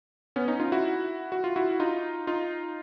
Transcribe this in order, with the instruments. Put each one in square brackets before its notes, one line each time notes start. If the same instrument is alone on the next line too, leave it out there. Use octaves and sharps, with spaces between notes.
[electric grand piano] B3 C#4
C#4 D#4
D#4 F4
E4 F#4
F#4
F4
E4 F#4
D#4 F4
D#4 F4